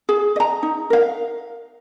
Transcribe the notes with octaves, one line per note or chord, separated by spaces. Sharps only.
G#4
D#5
A#5
D#4
A#4 F5